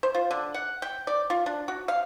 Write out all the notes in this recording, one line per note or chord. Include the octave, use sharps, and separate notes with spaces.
C5
F4
D3
F#5
G5
D5
F4
D4
F#4
F5